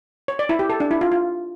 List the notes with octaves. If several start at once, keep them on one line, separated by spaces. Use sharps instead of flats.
C#5
D5
E4
G4
A4
D4
E4
F4
F4